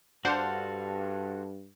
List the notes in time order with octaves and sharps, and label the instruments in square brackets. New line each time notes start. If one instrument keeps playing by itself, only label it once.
[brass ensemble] G2 [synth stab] D4 C5 F#5 [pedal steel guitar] F#4 A4 F5